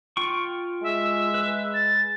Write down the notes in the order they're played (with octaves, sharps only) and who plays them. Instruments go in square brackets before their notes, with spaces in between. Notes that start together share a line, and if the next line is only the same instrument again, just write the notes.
[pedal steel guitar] F4 G5 C#6
[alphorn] G#3 [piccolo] E5
[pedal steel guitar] B4
[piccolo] A6